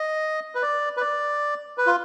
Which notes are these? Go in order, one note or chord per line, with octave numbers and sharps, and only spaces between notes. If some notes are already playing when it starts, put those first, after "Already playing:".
Already playing: D#5
B4
D5
B4
D5
B4
F4